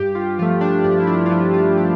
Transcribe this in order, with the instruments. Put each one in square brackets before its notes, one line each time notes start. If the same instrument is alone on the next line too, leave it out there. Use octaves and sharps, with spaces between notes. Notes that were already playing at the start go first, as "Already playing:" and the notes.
Already playing: [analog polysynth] G2 G4
F4
F3 A3 F4
D4
G2 D4
E4
D4
F4
F3 A3 E4
F4
G4